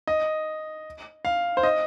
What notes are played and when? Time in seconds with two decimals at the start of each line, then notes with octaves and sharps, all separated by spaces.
0.07 D#5
1.25 F5
1.57 C5
1.63 D#5